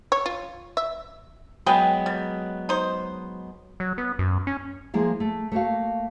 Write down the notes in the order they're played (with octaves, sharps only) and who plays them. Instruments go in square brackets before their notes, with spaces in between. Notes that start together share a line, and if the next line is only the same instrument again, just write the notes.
[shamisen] C#5
F4
E5
[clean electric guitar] F#3 G#3 B3 [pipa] G#4 B4 G5
[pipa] G3
D#4 C5
[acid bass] F#3
B3
F#2
C#4
[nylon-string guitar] F3 G#3 A#3 E4
A3
A3 A#3 F#4 F5